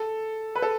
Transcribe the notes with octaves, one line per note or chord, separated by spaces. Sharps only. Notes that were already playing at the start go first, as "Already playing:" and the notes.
Already playing: A4
B4
A4